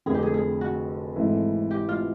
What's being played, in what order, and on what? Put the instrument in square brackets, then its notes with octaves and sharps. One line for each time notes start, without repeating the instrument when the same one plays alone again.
[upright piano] F1 F2 D3 [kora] G#4
[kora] G4
G#4
G#4
F#4
[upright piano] G#1 G#2 E3 A3
[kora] G4
F4